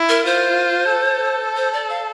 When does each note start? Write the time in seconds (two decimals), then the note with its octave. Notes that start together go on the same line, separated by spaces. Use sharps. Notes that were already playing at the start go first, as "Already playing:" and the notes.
Already playing: E4
0.09 A#4
0.26 F4 C5
0.91 A4
1.57 C5
1.73 D5
1.89 F5